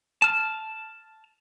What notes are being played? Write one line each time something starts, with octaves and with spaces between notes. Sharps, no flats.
A5 F6